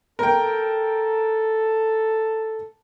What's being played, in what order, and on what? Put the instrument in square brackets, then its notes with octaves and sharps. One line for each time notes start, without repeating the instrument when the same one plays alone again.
[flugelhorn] A4 [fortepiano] A#4 G5